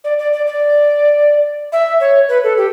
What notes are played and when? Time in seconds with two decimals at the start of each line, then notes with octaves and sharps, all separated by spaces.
0.04 D5
0.19 D5
0.33 D5
0.47 D5
1.72 E5
2.00 C#5
2.29 B4
2.44 A4
2.57 G4